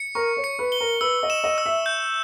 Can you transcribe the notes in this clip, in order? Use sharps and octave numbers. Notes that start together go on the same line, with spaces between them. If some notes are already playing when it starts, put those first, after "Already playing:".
Already playing: C#7
A#4 C#6
C#5
C#7
B4
G7
A#4
B4 E6
D#5
E7
D#5
E6
E5
G6